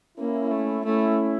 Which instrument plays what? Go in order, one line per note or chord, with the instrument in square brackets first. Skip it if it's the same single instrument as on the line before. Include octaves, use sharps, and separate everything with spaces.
[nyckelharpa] A#3 [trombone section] C#4 E4
[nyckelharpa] A3
[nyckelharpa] A3 [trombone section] C#4 E4